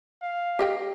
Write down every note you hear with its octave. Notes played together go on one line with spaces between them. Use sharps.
F5
G4 D#5 G5